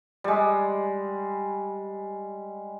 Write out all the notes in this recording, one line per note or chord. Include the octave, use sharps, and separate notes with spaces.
G3 G#3